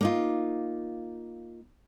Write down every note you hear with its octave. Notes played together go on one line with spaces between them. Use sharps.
A#3 D#4 F4